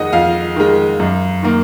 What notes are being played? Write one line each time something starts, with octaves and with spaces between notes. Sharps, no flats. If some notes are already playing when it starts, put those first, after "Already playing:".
Already playing: F2 D#3 G#3 D#5 F#5
F2 F5
D#3 G#3
F#2
D#3 A#3